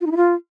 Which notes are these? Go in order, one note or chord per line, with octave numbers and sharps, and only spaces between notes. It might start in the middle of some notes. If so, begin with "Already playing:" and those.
F4
D#4
E4
F4